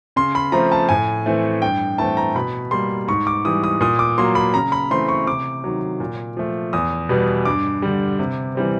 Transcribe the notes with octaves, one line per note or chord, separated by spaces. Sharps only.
C#3 C6
B5
F3 A3 C4 A#5
A5
A2 G#5
E3 A3 C4
G2 G5
E3 A3 C4 A5
A#5
B2 B5
G3 A#3 C6
G#2 C#6
D6
E3 G3 D#6
D#6
A#2 D#6
D6
F#3 A#3 C6
B5
C#3 A#5
B5
E3 A3 C4 C6
C#6
C3 D6
D#3 F#3
A#2
F3 A3
E2 D#6
B2 G3 B3
G2 D6
D3 G3
C3
E3 G3 C4